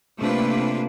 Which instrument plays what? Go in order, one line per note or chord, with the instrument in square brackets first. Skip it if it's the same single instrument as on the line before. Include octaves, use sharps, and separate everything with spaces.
[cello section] C3 A3 A#3 D4 F4 B4